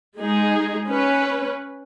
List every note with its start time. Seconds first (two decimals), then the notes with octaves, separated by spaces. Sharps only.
0.19 G#3 D#4 G#4
0.89 C#4 B4